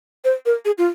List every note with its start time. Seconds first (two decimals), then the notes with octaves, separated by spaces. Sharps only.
0.25 C5
0.46 A#4
0.65 G#4
0.78 F4